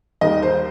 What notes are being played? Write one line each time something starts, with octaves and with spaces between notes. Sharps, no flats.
D#2 D#3 G3 D#5
C5